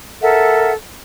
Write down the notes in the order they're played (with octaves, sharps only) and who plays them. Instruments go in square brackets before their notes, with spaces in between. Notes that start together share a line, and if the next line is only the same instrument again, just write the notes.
[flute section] A4 A#4 E5 F#5